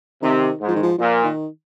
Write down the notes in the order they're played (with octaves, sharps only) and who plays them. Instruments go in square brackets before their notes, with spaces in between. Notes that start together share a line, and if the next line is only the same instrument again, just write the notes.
[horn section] C3 [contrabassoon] D#3
[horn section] G#2
[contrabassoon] F3
D#3
F3
[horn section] A#2 [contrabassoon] F3
[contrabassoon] D#3